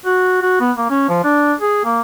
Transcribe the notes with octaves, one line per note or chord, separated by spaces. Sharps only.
F#4
F#4
B3
A#3
C#4
F3
D4
G#4
A#3